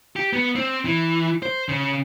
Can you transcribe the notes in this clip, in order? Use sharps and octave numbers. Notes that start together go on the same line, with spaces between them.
G4
B3
C4
E3
C5
C#3